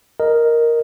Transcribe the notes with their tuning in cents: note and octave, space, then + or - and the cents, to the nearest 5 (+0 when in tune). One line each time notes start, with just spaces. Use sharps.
A#4 +0 D#5 +0